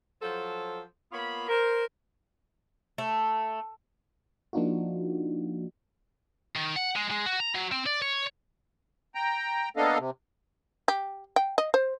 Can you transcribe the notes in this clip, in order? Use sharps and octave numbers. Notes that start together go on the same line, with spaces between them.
F3 F#3 A4 C5
A#3 B3 F4 C#5 B5
A#4 C5
A3
F3 A#3 D4 D#4 F4 F#4
D#3
F#5
G#3
G#3
F#4
A#5
F#3
C4
D5
C#5
G5 A#5
A#3 B3 D4 A4 D#5 F5
C3
G4
G5
D#5
C5